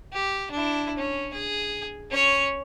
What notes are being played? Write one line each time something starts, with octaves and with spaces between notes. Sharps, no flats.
G4
D4 E4
C#4
G#4
C#4 C#5